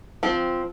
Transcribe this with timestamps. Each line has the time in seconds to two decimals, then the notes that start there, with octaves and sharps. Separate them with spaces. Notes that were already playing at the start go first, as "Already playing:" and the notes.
0.23 F3 C4